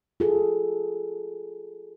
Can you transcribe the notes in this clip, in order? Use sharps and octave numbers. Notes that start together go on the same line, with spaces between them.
F4 G#4 A4